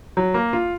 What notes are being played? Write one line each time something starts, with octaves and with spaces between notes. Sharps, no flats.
F#3
A#3
F4